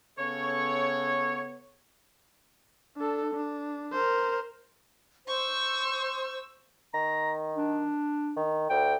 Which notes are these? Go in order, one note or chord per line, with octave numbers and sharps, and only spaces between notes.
C#3 B3 A4 C#5
D4 A4
D4
A#4 C5
C5 C#6 E6
D#3 A#5
D4
D#3
D2 G5